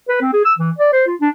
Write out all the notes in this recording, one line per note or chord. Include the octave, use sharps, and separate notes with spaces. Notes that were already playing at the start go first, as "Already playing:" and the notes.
B4
C4
G#4
E6
E3
D5
C5
F4
D4